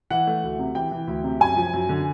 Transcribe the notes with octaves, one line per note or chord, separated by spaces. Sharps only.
E3 F#5
A3
D2
C3
E3 G5
E3
D2
C3
F#2 G#5
F3
F#2
D3